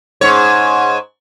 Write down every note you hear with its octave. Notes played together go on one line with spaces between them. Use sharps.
G#2 C#5